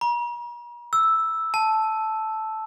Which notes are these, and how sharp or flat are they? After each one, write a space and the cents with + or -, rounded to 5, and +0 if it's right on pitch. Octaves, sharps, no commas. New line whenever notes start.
A#5 +45
E6 -5
A5 -5